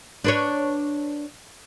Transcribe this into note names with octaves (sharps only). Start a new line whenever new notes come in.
D4 B4 C#5